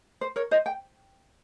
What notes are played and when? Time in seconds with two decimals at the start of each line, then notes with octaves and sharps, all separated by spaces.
0.21 C5
0.36 A#4 C#5
0.51 C5 D#5
0.66 G5